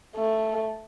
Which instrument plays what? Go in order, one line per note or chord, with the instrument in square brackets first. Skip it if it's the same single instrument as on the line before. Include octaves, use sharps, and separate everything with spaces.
[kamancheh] A3